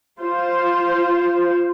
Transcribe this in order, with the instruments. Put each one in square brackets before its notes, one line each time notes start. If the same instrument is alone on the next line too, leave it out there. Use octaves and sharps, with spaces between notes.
[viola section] F4 C5